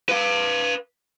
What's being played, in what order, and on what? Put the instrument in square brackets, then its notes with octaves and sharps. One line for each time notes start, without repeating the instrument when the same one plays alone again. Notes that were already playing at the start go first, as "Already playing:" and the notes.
[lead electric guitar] B4 F5